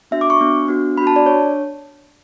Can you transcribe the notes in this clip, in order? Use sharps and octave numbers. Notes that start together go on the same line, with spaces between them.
B3 D4 F#4 E5
D6
C#6
B3 D4 F#4
B3 D4 F#4
B3 D4 F#4 B5
A5
D5
D4 C#5